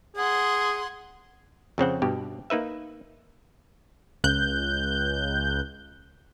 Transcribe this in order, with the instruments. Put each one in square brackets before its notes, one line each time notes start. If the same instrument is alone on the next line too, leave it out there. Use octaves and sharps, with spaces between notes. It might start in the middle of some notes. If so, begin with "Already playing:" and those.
[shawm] G#4 [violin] F#5 C6
[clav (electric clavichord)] F2 C#3 C4 F#5
G2 B2 G4
A#3 D#4 B4 E5
[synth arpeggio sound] C#2 F#6 G6